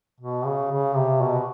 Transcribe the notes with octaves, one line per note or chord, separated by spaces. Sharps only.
B2
C#3
C#3
C3
B2